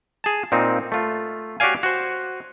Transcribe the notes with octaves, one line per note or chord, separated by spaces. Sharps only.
G#4 A5
A#2 C4 D#4
A3 F4
F#4 G4 C#5 D5 F5 G#5
F#4 C5